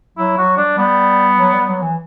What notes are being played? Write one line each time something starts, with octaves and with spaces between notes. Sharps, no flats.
F#3 E4
F#3 F#4
G3 D4
G3 B3
F#3
G3
F#3
E3